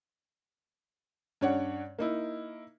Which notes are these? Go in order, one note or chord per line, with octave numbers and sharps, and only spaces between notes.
G2 C#4 C#5 D5 F#5
A#3 D#4 E4